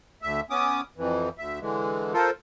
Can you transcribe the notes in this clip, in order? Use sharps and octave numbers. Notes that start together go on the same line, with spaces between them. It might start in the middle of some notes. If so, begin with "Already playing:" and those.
D2 E5
B3 C#4 D6 D#6
F2 E3
D2 E5
D3 E3 G#3
F4 A4 A#4 C5